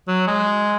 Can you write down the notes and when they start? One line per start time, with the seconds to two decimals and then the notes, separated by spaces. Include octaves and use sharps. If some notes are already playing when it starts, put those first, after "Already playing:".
0.08 F#3
0.27 G#3